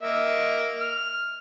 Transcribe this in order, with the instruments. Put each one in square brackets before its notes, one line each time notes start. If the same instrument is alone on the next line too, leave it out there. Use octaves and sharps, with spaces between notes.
[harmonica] A#3 D#5 E5
F6